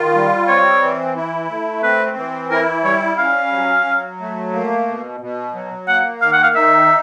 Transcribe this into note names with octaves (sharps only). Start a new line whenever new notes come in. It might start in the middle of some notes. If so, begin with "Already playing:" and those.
Already playing: D#3 F4
G3
C4 C#5
E3
E4
A3
C4 B4
E3
E4 A#4
G3 C#5
C#4 F5
F#3
F#3
A3
A#3
B2
B2
F#3
A#3 F#5
D#3 F5
F#5
F5
D#4 E5